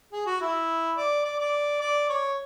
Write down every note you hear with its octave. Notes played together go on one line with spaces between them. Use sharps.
G#4
F#4
E4
D5
D5
D5
D5
C#5